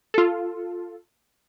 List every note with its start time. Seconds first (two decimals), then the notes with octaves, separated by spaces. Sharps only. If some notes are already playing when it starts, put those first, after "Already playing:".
0.14 F4 A4